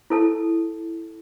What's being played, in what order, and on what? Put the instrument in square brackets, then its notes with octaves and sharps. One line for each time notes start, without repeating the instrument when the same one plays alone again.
[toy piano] E4 A4 A5